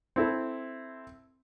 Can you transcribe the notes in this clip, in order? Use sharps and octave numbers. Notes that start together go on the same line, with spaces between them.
C4 E4 A4